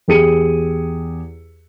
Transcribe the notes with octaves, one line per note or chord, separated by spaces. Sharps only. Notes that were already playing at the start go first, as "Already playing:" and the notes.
E2 G4 G#4 C#7 D#7